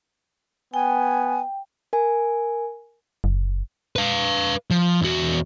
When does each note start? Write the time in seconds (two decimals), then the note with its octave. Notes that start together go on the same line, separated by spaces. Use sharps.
0.74 B3 G5 G#5
1.93 A#4 G#5
3.24 F#1
3.96 B4 F5
4.70 F3
5.01 E2 F#4